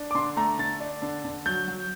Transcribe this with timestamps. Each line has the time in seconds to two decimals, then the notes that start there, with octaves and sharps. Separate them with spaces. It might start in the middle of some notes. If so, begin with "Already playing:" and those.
Already playing: D4
0.11 D6
0.15 D3 C6
0.36 A3 A#5
0.58 D3 A6
0.80 D4
1.02 D3
1.24 D3
1.46 F#3 G6
1.68 F#3